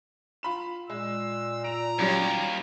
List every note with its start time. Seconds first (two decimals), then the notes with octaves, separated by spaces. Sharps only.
0.43 F4 B5 E7
0.90 A#2 G#3 E6
1.64 A#5 D7 F7
1.99 D#2 F#3 G3 C#4